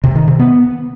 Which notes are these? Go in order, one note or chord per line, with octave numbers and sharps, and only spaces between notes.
C3
D#3
C3
B3